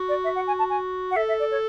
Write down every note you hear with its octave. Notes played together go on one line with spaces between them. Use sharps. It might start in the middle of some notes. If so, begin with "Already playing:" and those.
Already playing: F#4
D5
E5
F#5
G#5
A5
G#5
F#5
A4 E5
E5
D5
C#5